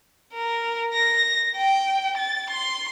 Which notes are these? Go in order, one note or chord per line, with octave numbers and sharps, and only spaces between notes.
A#4
A#6
G5
A6
C6